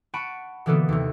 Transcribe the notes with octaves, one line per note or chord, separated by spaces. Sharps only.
F#5 A5 B5 C#6 D7 D#7
B2 D3 E3 A#3 B3 A4
D#2 C3